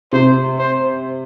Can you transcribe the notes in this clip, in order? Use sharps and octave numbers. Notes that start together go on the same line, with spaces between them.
C3 C5
C5